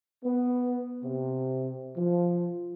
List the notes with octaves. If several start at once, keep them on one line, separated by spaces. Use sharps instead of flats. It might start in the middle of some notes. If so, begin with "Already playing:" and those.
B3
C3
F3